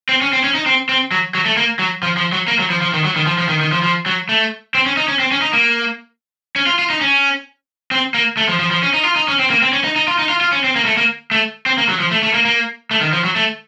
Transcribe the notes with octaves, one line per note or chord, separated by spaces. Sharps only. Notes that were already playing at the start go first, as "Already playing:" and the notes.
C4
C#4
C4
C#4
D#4
C4
C4
F#3
F#3
A3
A#3
F#3
F3
F3
F#3
A#3
F#3
F3
F3
D#3
F#3
D#3
F3
F3
D#3
D#3
F3
F3
F#3
A3
C4
C#4
D#4
C#4
C4
C#4
D#4
A#3
C#4
F4
F4
D#4
C#4
C4
A#3
A3
F3
F3
F3
C#4
D#4
F4
D#4
C#4
C4
A#3
C4
C#4
D#4
D#4
F4
D#4
F4
F4
C#4
C4
A#3
A3
A#3
A3
C4
A#3
F#3
F3
A3
A3
A#3
A#3
A3
D#3
F3
F#3
A3